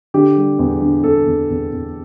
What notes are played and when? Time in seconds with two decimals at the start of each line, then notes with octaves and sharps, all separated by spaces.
0.14 D3 G4
0.36 G3
0.59 E2
0.82 D3
1.04 E2 A4
1.26 E2
1.50 E2
1.73 E2